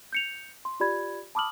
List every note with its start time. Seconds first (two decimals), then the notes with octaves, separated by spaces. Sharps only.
0.13 G6 C#7 F7
0.65 C6
0.80 F4 G4 D5 B5 G#6
1.35 A5 B5 D6 D#6 F6 F#7